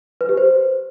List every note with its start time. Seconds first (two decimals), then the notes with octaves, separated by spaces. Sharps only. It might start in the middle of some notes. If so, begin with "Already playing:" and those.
0.21 B4
0.29 G4
0.37 C5